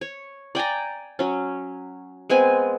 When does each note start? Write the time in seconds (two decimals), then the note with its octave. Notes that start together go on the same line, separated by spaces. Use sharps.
0.01 C#5
0.55 D5 G5 G#5 A#5
1.19 F#3 C#4
2.30 G#3 B3 C4 G#5